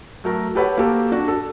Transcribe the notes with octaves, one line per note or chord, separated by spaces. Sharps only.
F#3 A3 A#4
G4 A4 B4 C#5 F#5
A#3 F#4 G4 A4
D4 F#4
A4